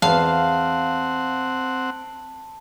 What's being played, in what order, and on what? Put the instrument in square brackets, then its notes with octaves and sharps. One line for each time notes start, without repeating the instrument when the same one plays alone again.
[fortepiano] E2 B3 [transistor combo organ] C4 F#5 [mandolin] F5 [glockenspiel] A5